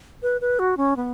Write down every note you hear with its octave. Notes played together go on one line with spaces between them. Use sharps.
B4
B4
F#4
C#4
B3